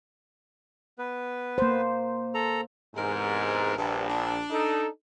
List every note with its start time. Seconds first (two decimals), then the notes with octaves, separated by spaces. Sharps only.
0.99 B3 B4
1.58 A#3 C5
2.34 A4 A#5
2.94 E2 G#2 C3 A#4
3.77 A#1 G2
4.08 D4
4.50 D#4 A4